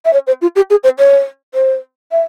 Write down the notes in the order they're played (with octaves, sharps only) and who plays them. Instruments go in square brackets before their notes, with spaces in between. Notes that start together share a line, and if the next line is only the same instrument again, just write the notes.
[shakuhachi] E5
C#5
C5
F4
G4
G#4
C5
C#5
C5
E5